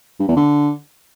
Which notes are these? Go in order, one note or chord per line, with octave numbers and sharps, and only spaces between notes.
G2
E2
D3